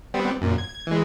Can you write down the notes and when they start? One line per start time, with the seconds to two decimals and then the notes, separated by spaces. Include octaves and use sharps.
0.14 G3 B3 C4
0.41 F#2 A#2
0.58 G#6
0.87 E3 G#3